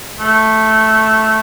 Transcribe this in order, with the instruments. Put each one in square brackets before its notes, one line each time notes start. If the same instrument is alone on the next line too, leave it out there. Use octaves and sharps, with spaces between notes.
[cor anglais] A3